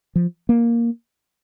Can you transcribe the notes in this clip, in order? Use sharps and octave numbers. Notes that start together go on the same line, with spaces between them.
F3
A#3